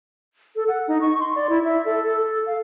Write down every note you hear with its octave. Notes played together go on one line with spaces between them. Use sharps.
A4
F#5
D#4
C#6
C6
D5
E4
E5
A4
A4
F5